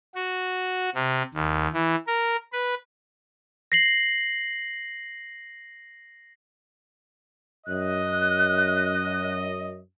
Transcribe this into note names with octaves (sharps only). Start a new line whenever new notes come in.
F#4
C3
D#2
E3
A#4
B4
A#6 C7 F#7
F#2 D#5 F#6